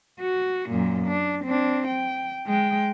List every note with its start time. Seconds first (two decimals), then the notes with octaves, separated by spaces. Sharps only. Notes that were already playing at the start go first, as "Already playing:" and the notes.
0.20 F#4
0.70 F#2 A#2
1.07 D4
1.45 C4 D4
1.88 G5
2.46 G#3 G5